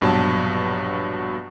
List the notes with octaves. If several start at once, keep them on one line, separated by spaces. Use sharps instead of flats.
A#1 G2 B2 F#3 B3 A5